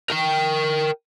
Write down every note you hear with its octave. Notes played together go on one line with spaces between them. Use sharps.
A#4 G5